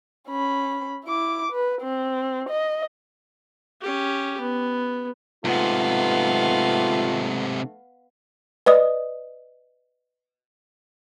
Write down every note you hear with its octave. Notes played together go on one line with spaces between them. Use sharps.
C#4 B5
E4 D6
B4
C4
D#5
C#4 G4
B3
G#2 C3 A3 B3 F4 F5
B4 D5 D#5 D#6